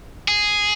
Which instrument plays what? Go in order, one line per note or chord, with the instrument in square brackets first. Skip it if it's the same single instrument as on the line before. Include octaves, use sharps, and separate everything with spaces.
[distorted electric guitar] G#4